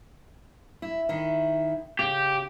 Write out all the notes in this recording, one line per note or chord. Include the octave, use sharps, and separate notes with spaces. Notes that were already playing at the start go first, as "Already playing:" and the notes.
E4
D#3 E4
C#3 G4